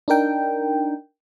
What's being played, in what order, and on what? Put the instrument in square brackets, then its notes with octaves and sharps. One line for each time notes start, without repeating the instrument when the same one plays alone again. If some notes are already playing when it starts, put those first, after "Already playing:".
[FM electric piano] D4 D#4 A#4 G5